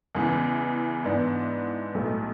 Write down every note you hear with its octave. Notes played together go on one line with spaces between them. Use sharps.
E2 C#3 E3 G#3
G#2 E3 B3 D4
B1 A2 F#3 A3